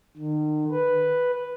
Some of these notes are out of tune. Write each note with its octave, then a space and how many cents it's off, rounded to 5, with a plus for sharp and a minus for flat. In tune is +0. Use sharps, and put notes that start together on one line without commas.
D#3 -40
B4 +0